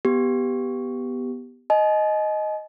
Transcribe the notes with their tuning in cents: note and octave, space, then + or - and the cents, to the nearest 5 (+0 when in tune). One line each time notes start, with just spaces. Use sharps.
B3 +0 G4 +0
D#5 +0 G#5 +45